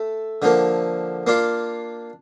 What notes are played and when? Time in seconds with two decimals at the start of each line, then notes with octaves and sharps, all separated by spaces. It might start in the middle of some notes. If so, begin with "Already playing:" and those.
Already playing: A3 A4
0.42 D3 F3 A#3
1.27 A#3 D4 F4